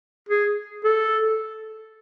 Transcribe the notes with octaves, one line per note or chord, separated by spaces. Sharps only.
G#4
A4